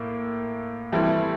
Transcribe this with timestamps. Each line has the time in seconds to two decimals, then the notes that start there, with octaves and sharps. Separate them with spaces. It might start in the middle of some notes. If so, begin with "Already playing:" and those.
Already playing: A2 A#3
0.92 E3 G3 A3 C4 E4